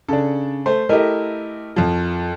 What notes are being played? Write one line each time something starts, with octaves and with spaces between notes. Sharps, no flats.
C#3 D4 A4
A3 C5
A3 E4 G4 A#4 D#5
F2 F3